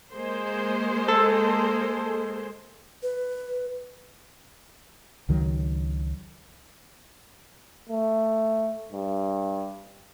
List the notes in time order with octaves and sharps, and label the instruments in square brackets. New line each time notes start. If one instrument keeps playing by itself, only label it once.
[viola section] G#3 A#3 C5
[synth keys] A4
[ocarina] B4
[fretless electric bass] C#2 D#3 F#3
[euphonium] A3
G2